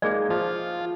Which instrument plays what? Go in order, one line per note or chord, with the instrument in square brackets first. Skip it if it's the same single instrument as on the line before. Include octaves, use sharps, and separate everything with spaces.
[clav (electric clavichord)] G#3 A#3 D#4 [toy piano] G#4 D5
[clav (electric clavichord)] F3 [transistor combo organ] F4